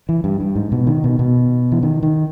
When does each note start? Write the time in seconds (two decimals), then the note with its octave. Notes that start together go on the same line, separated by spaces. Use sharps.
0.09 E3
0.24 G2
0.40 G2
0.55 G#2
0.72 B2
0.87 D#3
1.04 B2
1.19 B2
1.72 E3
1.83 D#3
2.03 D#3